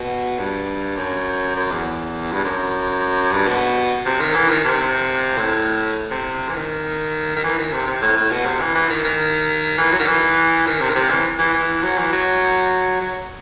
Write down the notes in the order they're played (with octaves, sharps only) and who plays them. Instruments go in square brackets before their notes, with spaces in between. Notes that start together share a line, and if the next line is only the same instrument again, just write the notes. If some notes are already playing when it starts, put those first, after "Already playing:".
Already playing: [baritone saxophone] B2
G2
F#2
F#2
E2
G2
F#2
G2
B2
C3
D#3
E3
D#3
C3
A2
C3
E3
D#3
D#3
E3
D#3
C3
C3
A2
A2
B2
C3
E3
E3
D#3
D#3
E3
F#3
D#3
E3
D#3
C3
D#3
C3
E3
E3
E3
F#3
E3
F#3
F#3